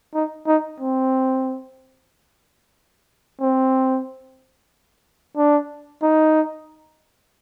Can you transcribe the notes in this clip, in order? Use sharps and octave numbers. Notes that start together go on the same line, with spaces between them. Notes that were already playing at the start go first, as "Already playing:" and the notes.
D#4
D#4
C4
C4
D4
D#4